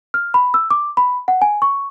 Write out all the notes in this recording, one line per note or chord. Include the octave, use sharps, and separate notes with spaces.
F6
B5
E6
D6
B5
F#5
G#5
C#6